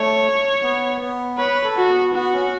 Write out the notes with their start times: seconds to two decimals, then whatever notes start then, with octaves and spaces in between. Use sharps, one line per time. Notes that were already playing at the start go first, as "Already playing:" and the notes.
Already playing: A3 C#5
0.63 B3
1.01 B3
1.38 B4 C#5
1.64 A4
1.77 F#4
1.89 B3
2.14 B3 F#4
2.33 C#4